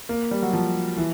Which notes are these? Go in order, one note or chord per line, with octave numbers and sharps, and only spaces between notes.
A#3
G3
F#3
F3
E3